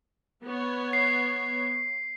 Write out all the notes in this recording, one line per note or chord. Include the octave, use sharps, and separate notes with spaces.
B3 C#5
C7